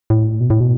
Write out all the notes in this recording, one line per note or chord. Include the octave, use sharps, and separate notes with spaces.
A2
B2
A2
B2